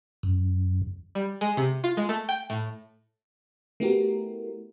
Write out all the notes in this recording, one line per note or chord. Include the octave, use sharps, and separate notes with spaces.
F#2
G3
G#3
C3
F4
G#3
A3
G5
A2
A3 B3 E4 F#4 G4 A#4